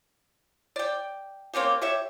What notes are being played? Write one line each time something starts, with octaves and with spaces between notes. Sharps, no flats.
D5 G5
A#3 C4 C#4 G4
G4 C#5 E5